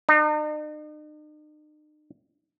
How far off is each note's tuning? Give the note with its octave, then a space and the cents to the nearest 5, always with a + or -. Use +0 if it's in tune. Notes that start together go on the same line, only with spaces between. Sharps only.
D#4 -45